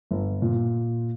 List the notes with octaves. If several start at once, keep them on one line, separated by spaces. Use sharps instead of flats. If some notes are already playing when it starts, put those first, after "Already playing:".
G1
A#2